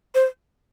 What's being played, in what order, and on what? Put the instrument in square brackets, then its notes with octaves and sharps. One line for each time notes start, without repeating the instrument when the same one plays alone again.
[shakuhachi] C5